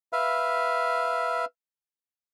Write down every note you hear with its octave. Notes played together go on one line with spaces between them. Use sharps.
B4 E5 F5